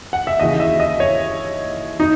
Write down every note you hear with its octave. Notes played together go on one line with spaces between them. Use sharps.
F#5
E5
D#2 C#3 E3 D#5
E5
D#5
C#5
D#4